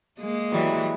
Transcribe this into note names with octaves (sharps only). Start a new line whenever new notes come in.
G#3 A#3
E3 F#3 G3